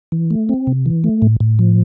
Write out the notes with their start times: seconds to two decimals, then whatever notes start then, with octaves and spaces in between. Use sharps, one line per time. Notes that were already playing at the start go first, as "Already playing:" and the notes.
0.12 E3
0.31 A3
0.49 C4
0.67 C3
0.86 E3
1.04 A3
1.22 A2
1.40 A2
1.59 F3